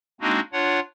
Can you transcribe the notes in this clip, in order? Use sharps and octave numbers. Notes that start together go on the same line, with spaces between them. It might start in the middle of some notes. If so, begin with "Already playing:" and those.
G#3 A#3 C4 D4 D#4 F#4
D4 F4 C#5 F#5